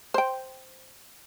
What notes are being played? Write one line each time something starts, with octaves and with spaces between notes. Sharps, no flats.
C5 G5